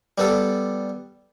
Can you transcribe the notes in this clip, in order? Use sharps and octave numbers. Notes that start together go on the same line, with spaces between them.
G3 B3 A4